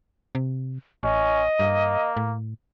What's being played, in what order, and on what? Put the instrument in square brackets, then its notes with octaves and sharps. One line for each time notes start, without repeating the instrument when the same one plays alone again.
[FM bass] C3
[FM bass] A1 [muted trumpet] C#4 [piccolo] D#5
[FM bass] G2 [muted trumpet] A#3
[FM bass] A2